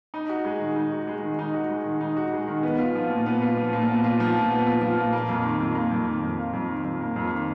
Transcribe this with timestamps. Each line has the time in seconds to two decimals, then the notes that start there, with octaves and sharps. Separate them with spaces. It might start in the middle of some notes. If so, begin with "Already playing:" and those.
0.14 D#4
0.29 F#4
0.45 G#3
0.60 D#3
0.76 D#4
0.92 F#4
1.07 G#3
1.23 D#3
1.39 D#4
1.54 F#4
1.69 G#3
1.86 D#3
2.01 D#4
2.17 F#4
2.33 G#3
2.48 D#3
2.63 B3
2.79 F4
2.95 F3
3.10 A#2
3.26 B3
3.42 F4
3.57 F3
3.73 A#2
3.89 B3
4.04 F4
4.20 F3
4.35 A#2
4.51 B3
4.66 F4
4.81 F3
4.98 A#2
5.13 A#3
5.29 F2
5.44 D#3
5.60 F2
5.75 A#3
5.91 F2
6.07 D#3
6.23 F2
6.39 A#3
6.53 F2
6.69 D#3
6.84 F2
7.01 A#3
7.16 F2
7.32 D#3